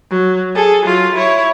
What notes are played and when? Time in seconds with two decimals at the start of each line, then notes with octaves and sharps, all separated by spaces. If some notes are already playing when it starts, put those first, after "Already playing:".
0.10 F#3
0.55 G#4 A4
0.85 F#3 F4
1.14 E4 C#5